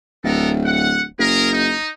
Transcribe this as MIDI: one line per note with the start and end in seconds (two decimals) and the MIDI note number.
0.24 1.07 26
0.24 0.49 59
0.24 0.49 69
0.24 0.49 70
0.64 1.02 78
1.19 1.74 30
1.19 1.51 68
1.19 1.51 70
1.52 1.89 63